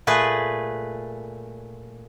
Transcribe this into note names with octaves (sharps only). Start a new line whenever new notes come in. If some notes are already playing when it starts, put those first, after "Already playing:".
A#2 A3 G#4 B4